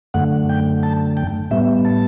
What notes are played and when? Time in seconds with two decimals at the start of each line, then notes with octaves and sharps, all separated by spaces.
0.14 F#2 D3 A3 F#5
0.49 G5
0.83 A5
1.17 G5
1.51 A2 G3 B3 E5
1.85 A5